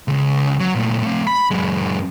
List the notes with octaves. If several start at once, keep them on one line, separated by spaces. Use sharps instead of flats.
C#2 C#3
F#3
A#2 A3
A3 C4
B5
F#2 G#3